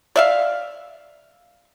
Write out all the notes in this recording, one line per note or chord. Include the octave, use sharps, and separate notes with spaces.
D5 E5 F5